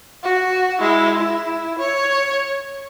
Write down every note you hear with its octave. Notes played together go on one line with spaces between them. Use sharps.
F#4
G#3 E4
E4
C#5